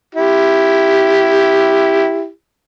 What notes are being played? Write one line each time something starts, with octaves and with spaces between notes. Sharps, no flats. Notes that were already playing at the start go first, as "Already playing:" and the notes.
E4 G4